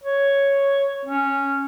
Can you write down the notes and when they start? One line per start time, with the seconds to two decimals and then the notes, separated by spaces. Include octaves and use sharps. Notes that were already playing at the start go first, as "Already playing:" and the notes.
0.04 C#5
1.05 C#4